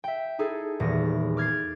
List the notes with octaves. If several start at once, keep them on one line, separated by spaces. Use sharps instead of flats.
E5 G5
D#4 E4 G#4 A4
D#1 E2 E3 A#6
D6 F6 G#6 A6 C7